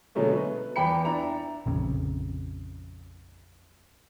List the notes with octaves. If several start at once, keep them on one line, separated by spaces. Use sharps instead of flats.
B2 D3 F#3 G#3 A3 C#4
B4
E2 B3 G5 B5 C#7
D4 E4 A#5
A#1 F2 C#3